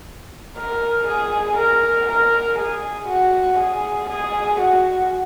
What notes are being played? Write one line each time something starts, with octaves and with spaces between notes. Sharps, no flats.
A#4
G#4
A#4
A#4
G#4
F#4
G#4
G#4
F#4